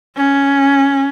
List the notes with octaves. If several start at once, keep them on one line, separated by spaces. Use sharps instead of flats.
C#4